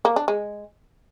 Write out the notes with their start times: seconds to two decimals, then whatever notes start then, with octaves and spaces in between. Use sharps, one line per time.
0.05 A#3
0.16 D4
0.28 G#3